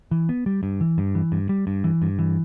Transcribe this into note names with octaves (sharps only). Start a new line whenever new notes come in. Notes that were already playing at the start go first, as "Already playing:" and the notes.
E3
B3
G3
G2
E3
G2
E3
G2
G3
G2
E3
G2
E3